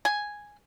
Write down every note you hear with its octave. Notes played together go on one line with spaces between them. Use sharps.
G#5